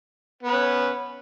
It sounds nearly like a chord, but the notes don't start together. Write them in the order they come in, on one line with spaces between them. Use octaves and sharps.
B3 B4 C#4